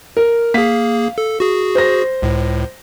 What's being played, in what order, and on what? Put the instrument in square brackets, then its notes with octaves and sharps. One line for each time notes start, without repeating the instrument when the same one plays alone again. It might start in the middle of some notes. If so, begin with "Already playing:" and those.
[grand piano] A#4
[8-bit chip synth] A#3 G#4 [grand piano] F5 B6
[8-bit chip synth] A4
F#4 G#4
[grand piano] C5 A#6
[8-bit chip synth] C#2 A2